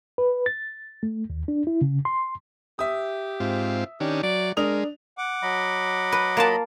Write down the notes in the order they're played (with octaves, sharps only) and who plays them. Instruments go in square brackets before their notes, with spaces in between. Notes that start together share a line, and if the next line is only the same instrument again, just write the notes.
[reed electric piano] B4
A6
A3
D#2
D4
E4
C#3
C6
[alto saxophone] G4 [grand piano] E5 D#6
[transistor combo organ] G#2 C4 F4
[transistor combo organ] D#3 C#4 D4 [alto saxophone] G4
[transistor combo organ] F#3 [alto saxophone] D5
[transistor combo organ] G#3 [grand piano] D4 D#6 F7 [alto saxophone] A#4
[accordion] F#5 D6
[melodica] F#3 D#5 B5
[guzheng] B4
A#3 F4 A5